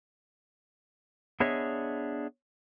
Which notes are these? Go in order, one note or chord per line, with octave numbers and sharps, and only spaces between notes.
B3 D4 G#4 C#5 D#5 E5